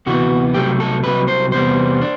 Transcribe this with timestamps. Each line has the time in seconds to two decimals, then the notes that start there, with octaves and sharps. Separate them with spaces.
0.06 D2 C3 E3 B3 F#4
0.54 C2 C3 F#3 A3 G4
0.80 A4
1.04 C2 C3 F#3 B4
1.28 C5
1.52 E2 C3 G3 B3 C5
2.01 D4